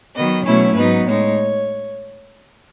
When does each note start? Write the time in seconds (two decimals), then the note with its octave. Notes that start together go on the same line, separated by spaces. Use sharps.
0.16 D#3 F#3 B3 D#5
0.46 B2 F#3 A3 C#4 E4 C#5
0.76 G#2 F#3 B3 D#4 B4
1.06 A2 G#3 D#4 C#5